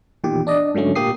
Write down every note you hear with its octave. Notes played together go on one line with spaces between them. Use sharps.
E2 A#2 D#3 G4
D4 D5 D#5
G#2 D3 F#3 A3 C#4
A#2 A#3 G4 D#6 C7